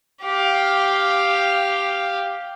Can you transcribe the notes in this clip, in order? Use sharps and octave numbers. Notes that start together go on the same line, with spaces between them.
G4 F5